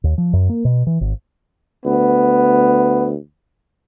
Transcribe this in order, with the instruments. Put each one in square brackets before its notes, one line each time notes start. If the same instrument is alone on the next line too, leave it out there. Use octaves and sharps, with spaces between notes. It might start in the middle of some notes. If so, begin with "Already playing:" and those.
[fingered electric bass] D#2
F3
F#2
A#3
B2
E3
G#1
[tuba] D2 [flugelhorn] B3